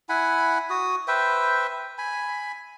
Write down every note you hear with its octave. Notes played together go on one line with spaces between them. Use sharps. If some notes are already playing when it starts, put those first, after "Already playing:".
E4 F#5 G#5 B5
F#4 D#6
B4 C5 E5 G5
G#5 B5